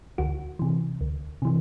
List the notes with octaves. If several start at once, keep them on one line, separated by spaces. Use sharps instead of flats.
D2 F#4
C3 E3
D2
C3 E3